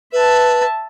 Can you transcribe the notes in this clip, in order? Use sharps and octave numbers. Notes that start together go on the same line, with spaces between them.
B4 E5 A5